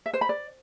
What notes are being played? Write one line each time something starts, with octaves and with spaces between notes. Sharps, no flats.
E5
C5
B5
D5